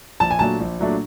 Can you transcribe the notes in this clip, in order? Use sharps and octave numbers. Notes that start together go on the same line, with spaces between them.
A#1 A5
G#5
A#2 F#3 A3 D4 A5
A#1
A#2 F#3 A3 D4